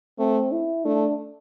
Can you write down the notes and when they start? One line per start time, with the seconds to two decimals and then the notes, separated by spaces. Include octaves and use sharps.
0.19 A3 C4
0.52 E4
0.85 A3 D4